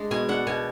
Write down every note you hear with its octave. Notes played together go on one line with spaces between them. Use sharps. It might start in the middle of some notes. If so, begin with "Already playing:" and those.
Already playing: G#3 D4
B2 G#5
D4 F#5
B2 G#5